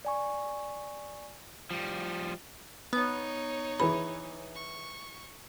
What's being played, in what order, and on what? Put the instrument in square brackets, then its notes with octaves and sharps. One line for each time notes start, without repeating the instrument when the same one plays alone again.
[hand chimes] D5 G#5 C#6
[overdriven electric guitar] F3 G3
[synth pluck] B3 [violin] D#4 C#5
[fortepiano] E3 G#4 [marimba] B5
[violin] C#6